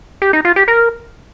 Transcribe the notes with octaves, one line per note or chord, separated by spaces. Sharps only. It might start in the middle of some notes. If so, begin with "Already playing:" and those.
G4
D#4
F4
G4
A#4